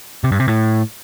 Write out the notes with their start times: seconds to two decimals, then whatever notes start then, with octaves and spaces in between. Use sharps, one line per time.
0.24 C3
0.32 G2
0.40 C3
0.48 A2